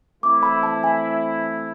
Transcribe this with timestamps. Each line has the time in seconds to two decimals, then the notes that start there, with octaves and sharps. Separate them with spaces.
0.23 E3 A3 C4 E4 D6
0.43 B5
0.63 A5
0.84 G#5